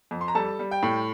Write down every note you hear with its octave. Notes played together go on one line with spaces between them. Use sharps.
F2
C6
A#5
G3 A4 A5
G3
G5
A2